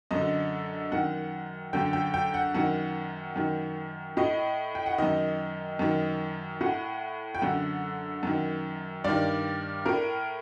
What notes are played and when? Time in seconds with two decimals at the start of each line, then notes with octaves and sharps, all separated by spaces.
0.11 F#2 D3 D#5
0.92 F#2 D#3 F#5
1.73 F#2 D3 G5
1.93 G5
2.14 G5
2.34 F#5
2.55 F#2 D#3 F#5
3.36 F#2 D#3
4.17 A2 D#5
4.75 G5
4.86 F#5
4.98 F#2 D#3 D#5
5.79 F#2 D#3
6.61 A2 F#5
7.35 G5
7.42 F#2 D3 F#5
8.23 F#2 D#3
9.04 G2 D#3 D5
9.86 A2 A#4